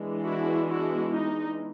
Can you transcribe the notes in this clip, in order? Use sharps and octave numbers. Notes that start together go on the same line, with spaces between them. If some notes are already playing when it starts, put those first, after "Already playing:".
Already playing: E3 G#3 B3 D4
E4 F#4
E4 F#4
D#4